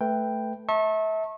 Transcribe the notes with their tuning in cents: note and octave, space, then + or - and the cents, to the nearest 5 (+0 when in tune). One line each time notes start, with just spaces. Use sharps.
A3 +0 B4 +0 G5 +5
E5 -35 A5 +10 C#6 -35